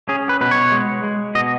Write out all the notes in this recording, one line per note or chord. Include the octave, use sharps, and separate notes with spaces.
C#4 G#4
B4
B2 B4
C#5
G#3
G#3
B2 D#5